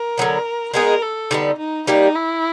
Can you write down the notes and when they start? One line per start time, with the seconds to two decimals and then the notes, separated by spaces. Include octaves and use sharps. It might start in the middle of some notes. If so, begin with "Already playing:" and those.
Already playing: A#4
0.18 D3 F#3 B3
0.73 G#3 B3 D#4 G#4 A#4
1.02 A4
1.31 D3 G3 B3 D#4
1.58 D#4
1.87 G3 A#3 D4 D#4 G4
2.15 E4